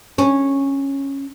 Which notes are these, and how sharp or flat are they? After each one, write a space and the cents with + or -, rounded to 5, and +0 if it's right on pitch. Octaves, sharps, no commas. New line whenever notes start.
C#4 -10